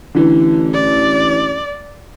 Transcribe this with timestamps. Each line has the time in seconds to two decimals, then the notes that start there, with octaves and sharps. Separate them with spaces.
0.15 A1 D3 E3
0.74 D5